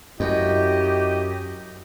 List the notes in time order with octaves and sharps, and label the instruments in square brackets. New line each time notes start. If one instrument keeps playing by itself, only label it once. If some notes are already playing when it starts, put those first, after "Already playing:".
[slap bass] F#2 [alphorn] E4 [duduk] G4 [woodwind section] D#5